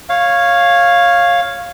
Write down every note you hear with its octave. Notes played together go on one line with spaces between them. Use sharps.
C#5 F5